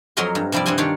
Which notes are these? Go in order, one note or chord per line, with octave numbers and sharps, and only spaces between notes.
F2 F#3 A#4 D#5 G#5 C6
G2
C3 F3 G3 E4 D5
G2 C4 C5 F#5 G#5 C6
D#3 D4 F4 G4 C#5 D5